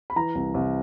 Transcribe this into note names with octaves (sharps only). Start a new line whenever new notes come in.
B5
E3 A#5
C2
C2